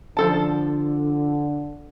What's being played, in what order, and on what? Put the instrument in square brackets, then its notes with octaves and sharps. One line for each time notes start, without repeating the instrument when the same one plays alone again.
[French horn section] D3 [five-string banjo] F3 A4 A5